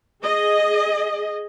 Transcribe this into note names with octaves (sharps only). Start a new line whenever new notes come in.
G#4 D#5